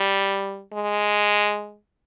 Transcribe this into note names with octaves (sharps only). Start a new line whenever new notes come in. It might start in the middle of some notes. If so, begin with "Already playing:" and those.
Already playing: G3
G#3